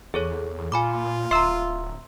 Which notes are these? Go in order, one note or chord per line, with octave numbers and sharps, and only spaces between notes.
E2 G#4 A4 C#5
A#2 F4 G#5 B5 D6
D1 E5 A#5 C6 E6